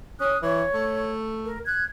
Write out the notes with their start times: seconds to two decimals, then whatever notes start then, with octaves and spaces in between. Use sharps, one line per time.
0.20 C#4 D#6 F#6
0.42 E3 C#5
0.74 A3
1.44 A#4
1.66 F#6 G#6